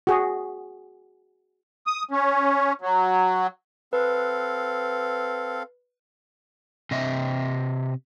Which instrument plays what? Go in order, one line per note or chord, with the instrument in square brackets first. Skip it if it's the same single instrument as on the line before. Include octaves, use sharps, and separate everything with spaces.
[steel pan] F#4 G#4
[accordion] D#6
C#4
F#3
[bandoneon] C4 A4 F5 [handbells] B4
[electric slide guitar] C3 D#5 E5